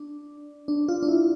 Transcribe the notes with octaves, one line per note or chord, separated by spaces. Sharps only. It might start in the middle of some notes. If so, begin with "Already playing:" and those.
Already playing: D4
D4
F4
D4
E4